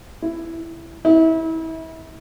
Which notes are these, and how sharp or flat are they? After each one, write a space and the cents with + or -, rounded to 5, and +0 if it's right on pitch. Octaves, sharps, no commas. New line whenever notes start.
E4 +5
E4 -30